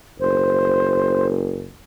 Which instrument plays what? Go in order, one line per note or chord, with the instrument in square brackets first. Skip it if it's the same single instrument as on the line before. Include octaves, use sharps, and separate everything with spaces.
[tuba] F#1 [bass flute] C5